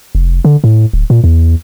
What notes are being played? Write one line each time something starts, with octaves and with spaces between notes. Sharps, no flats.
F1
D3
A2
D1
A#2
E2